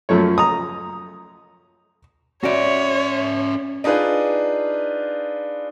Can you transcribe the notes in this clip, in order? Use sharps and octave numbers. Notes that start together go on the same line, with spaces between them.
F#2 F3 A3 C#5
A#5 D#6
C#4 F#4 C#5 D5 E5
D4 D#4 F4 G#4 B4